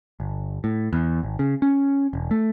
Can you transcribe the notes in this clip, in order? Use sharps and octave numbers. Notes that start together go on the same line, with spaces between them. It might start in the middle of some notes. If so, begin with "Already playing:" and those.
G1
A2
E2
G#1
C#3
C#4
E1
A3